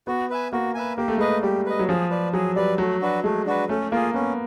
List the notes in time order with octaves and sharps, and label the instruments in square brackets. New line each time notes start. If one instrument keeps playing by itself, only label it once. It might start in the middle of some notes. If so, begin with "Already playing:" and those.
[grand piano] B3 [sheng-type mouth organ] F#4
[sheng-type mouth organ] B4 E5 G#5
[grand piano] A#3 [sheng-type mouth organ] F#4
[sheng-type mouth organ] B4 E5 G#5
[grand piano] A#3 [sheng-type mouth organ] G4
[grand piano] A3
[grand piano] G#3 [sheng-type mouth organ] B4 D#5
[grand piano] A3
[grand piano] G3 [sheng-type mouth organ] G4
[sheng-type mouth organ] B4 D#5
[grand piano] F#3
[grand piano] F3 [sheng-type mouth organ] G#4
[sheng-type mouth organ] B4 D5
[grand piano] F#3 [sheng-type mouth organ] G#4
[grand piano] G3 [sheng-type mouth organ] B4 D5
[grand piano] F#3 [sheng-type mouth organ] A3
[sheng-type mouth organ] D4 F#4 B4
[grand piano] G#3 [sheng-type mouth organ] A3
[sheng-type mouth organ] D4 F#4 B4
[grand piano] A3 [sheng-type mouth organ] C#4
[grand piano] A#3 [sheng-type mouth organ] F4
[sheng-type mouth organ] G#4
[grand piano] B3 [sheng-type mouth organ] C#4